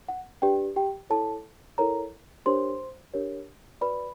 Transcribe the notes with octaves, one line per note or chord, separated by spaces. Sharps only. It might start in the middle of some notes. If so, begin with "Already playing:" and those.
F#5
D4 G4 B4 D5 G5
G4 G5
E4 A4 C#5 A5
E4 A4 A#4 C#5 A#5
D4 G4 A#4 C5 C#5 C6
D4 G4 A#4 C#5
F#4 B4 D5 B5